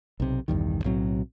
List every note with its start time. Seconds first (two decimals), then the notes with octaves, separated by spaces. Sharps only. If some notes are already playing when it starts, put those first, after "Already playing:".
0.20 B1 C3
0.48 B1 E2 G2 D#3
0.84 B1 A2 F#3 C4